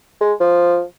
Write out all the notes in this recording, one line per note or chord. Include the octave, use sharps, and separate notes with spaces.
G#3
F3